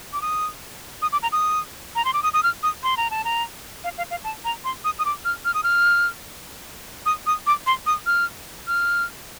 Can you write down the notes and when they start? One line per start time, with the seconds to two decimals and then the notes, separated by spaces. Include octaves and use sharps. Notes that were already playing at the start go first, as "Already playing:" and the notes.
0.13 D6
0.22 D#6
1.02 D#6
1.12 D6
1.23 A#5
1.32 D#6
1.95 A#5
2.05 C6
2.14 D6
2.23 D#6
2.33 D#6
2.43 F6
2.63 D#6
2.83 C6
2.97 A#5
3.11 A5
3.25 A#5
3.84 F5
3.98 F5
4.11 F5
4.24 A5
4.45 A#5
4.64 C6
4.84 D#6
4.99 D#6
5.05 D6
5.25 F6
5.45 F6
5.54 D#6
5.63 F6
7.06 D#6
7.27 D#6
7.47 D6
7.66 C6
7.86 D#6
8.06 F6
8.67 F6